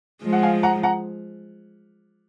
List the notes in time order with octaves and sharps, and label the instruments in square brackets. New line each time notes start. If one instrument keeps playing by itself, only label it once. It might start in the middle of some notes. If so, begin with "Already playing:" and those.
[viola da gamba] F3 G#3
[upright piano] F#5
F5 G#5
F#5 A#5
F#5 A#5